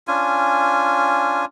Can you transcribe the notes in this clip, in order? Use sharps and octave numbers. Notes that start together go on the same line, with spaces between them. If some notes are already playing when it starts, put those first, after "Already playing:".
C#4 D4 F4 G#5